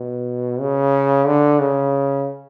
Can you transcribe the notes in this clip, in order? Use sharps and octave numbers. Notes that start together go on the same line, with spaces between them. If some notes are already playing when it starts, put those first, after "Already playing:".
Already playing: B2
C#3
D3
C#3